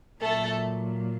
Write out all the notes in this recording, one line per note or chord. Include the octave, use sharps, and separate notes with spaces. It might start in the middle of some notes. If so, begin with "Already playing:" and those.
A#2 F#3 A3 A4